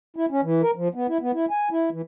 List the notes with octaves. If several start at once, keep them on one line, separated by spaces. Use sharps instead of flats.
E4
C#4
E3
A#4
F3
B3
E4
B3
E4
G#5
E4
E3